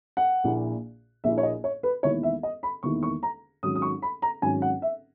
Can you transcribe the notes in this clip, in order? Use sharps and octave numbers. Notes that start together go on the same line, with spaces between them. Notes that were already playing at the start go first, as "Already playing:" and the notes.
F#5
A#1 A#2 A#3 E4
A#1 A#2 A#3 E4 E5
C#5
D#5
C#5
B4
E1 E2 D#3 A#3 E4 C#5
E5
D#5
B5
E1 E2 D#3 A#3 E4 C#6
C#6
A#5
G#1 G#2 F#3 C#4 D#6
D#6
C#6
B5
A#5
G#1 G#2 F#3 C#4 G#5
F#5
E5